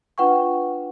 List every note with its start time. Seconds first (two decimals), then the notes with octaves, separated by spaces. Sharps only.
0.18 D4 F4 B4 F#5 G5 C#6